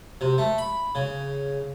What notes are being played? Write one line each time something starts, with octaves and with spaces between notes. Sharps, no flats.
C3
A3
B5
C#3